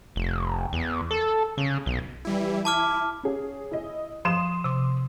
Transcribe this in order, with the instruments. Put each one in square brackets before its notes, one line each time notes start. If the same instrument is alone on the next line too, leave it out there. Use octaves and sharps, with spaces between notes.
[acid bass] F1
E2
A4
C#3
B1
[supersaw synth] E3 G3 E4
[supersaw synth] E4 [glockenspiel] A5 D6 F6
[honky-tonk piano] C#4 G#4
E4 D#5
[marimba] F3 [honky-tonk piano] C6 D#6 E7
[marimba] C3 D6